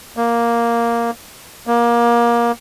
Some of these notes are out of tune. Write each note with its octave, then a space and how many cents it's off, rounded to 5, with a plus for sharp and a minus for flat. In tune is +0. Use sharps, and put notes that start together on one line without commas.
A#3 +5
A#3 +25